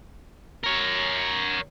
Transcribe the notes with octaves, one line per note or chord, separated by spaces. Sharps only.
A#4 C#5